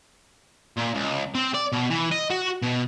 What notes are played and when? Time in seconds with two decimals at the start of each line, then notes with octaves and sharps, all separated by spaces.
0.77 A#2
0.94 C#2
1.35 C4
1.54 D5
1.72 B2
1.90 E3
2.12 D#5
2.31 F#4
2.62 B2